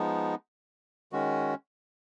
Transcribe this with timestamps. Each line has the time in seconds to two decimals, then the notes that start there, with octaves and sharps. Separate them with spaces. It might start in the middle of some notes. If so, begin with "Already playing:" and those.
Already playing: F3 G#3 B3 D#4
1.12 D#3 G#3 C#4 F#4